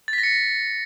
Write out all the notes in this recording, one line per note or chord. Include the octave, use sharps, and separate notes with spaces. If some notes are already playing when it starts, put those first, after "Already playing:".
A6
B6
A#6
C#7